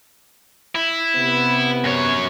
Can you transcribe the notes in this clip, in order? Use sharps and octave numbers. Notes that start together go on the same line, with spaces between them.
E4
C3 B3
F#2 C#5